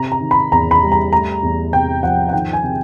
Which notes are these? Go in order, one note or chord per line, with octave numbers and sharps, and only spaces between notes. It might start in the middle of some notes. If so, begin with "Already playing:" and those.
Already playing: C3 A#5
A#5
D#3
B5
E2 A#5
B5
G3
A#5
A3 A#5
E2
C3 G5
F3 F#5
F#5
D#3 G5
G#5
C3